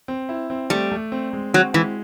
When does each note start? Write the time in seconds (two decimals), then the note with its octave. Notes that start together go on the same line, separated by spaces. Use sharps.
0.08 C4
0.29 E4
0.50 C4
0.70 G3 A3
0.92 A3
1.12 C4
1.33 G#3
1.53 F#3 C4
1.74 E3 G#3